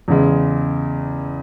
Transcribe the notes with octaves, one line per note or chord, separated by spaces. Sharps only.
E2 C#3 G#3